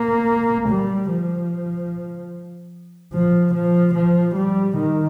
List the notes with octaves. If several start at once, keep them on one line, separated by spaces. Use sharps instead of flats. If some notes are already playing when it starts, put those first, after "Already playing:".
Already playing: A#3
G3
F3
F3
F3
F3
G3
D#3